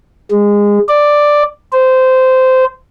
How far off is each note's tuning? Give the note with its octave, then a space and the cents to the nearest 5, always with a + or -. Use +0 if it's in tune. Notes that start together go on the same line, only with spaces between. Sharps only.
G#3 -20
D5 +5
C5 -15